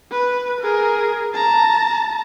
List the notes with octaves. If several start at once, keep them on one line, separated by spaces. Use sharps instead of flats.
B4
G#4 A#4
A5 A#5